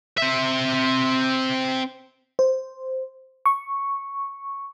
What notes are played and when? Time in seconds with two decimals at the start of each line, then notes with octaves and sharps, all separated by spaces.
0.18 C4 E5
2.39 C5
3.46 C#6